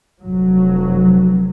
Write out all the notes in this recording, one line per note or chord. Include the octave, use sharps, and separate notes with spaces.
F1 F#3